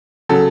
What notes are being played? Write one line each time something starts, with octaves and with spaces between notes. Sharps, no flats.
C#3 F#3 A4